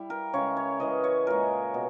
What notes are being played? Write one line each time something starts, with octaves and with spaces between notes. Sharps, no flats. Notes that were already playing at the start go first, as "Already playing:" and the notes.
Already playing: G3 E4
A#4
C#3 G#3 C#5
C#5
C#3 E3 G#3 D#5
C#5
A#2 G#3 A#4
B2